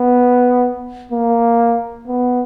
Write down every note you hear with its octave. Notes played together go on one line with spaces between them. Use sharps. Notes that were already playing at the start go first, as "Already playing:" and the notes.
Already playing: B3
A#3
B3